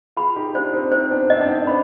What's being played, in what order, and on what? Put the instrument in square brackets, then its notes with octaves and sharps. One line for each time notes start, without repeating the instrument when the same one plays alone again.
[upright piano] F4 G#4 [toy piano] B5
[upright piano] D#4 G4
[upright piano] D4 F4 [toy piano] C5
[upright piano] C4 D#4
[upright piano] C4 D#4 [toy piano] C5
[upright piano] B3 D4
[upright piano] C4 [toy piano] D#5
[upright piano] D4
C4 D#4
[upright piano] B3 D4 [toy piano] B5